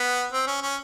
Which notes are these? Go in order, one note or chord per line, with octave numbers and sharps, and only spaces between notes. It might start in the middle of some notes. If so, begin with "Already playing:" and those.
Already playing: B3
C4
C#4
C#4